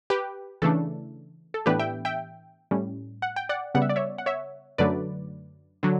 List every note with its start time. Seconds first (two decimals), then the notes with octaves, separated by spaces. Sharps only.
0.10 G4 B4
0.62 C#3 E3 A3 D4 A4
1.54 A4
1.66 A2 E3 B3 D4 G4 B4
1.79 E5 G5
2.05 E5 G5
2.71 A2 G3 C#4
3.22 F#5
3.36 G5
3.49 D5 F#5
3.75 C#3 G3 B3 F#5
3.82 E5
3.89 D5
3.96 C#5 E5
4.18 F#5
4.26 C#5 E5
4.78 F#2 D3 F#3 A3 B4 D5
5.83 D3 F#3